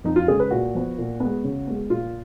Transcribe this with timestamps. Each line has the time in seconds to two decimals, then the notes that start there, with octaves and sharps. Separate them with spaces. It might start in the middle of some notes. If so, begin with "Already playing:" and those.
0.04 F2 D#4
0.16 F4
0.28 C#3 G#3 G#4
0.40 B4
0.51 A#2 F#4
0.75 F3 B3
0.98 A#2
1.20 G#3 B3
1.44 C#3
1.67 G#3 B3
1.90 A#2 F4